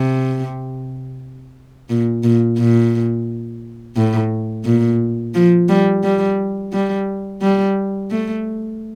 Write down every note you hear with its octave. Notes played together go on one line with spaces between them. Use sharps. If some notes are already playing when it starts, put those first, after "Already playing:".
Already playing: C3
A#2
A#2
A#2
A2
A#2
F3
G3
G3
G3
G3
A3